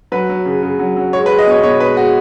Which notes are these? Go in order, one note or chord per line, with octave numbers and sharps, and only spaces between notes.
F#3 B4
F#3
C#3
C#3
F#3
F#3
G#3 C#5
B4
G#3
D#5
B2 C#5
B2 C#5
G#3 B4
G#3 F#4